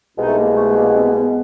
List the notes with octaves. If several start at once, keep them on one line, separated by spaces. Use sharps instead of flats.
C2 B2 G#3 D#4
A3
A#3
A3
A#3
C4
B3
A#3
B3